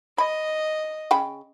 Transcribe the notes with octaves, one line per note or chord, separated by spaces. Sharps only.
D#5 B5
C#3 G5 B5